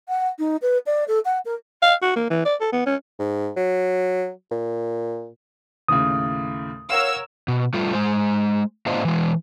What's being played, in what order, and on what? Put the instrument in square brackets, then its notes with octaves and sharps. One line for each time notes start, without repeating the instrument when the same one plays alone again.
[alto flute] F#5
D#4
B4
D5
A4
F#5
A#4
[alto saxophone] F5
F#4
A#3
E3
D5
A4
B3
C#4
[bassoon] G#2
F#3
A#2
[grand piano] D#2 A2 C#3 [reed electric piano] D#6
[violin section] A#4 C#5 E6 [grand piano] F5 F#5
[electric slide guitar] B2
G3 A3 F4
G#3 C5
A2 B3 D4 F4 C5 D#5
E3 G#3